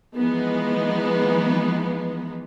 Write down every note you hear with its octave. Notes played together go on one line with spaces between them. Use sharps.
E3 F3 G#3 B3 D#4